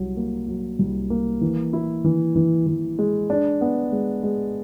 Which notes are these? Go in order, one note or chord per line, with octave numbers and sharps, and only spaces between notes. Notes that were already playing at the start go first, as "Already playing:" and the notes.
Already playing: C2 F#3
A#3
F#3
C2
A#3
E3
E4
E3
E3
E3
G#3
D4
B3
G#3
G#3